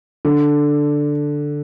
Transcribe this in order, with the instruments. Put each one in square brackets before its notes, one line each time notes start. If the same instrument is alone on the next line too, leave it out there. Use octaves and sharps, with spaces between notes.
[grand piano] D3